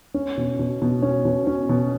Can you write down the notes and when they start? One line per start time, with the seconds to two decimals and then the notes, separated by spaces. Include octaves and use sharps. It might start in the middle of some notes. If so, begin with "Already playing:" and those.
0.14 C#4
0.37 B2
0.59 B2
0.82 B2
1.02 C#4
1.25 B2
1.47 C#4
1.69 B2